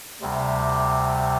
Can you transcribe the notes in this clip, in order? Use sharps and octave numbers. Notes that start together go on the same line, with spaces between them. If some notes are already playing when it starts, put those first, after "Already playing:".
D2 C3 G3